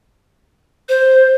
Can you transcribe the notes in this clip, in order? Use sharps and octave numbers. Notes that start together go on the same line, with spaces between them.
C5